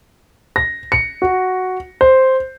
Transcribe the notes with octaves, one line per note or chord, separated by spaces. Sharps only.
A#6
C#7
F#4
C5